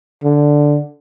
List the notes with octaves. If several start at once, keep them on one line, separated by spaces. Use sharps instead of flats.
D3